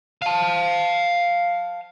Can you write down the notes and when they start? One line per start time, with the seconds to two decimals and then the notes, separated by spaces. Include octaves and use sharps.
0.22 F5 A5